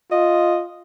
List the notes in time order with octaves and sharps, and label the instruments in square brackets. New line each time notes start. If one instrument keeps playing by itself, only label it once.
[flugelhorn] F4 [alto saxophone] D#5